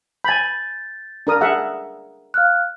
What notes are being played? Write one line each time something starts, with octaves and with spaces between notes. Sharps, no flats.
G#5 B5 G6 A6
D4 A#4 D#6
G#4 E5 F#5
F5 F6 F#6